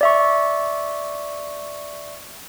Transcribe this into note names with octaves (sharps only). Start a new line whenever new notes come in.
D5 E5 C#6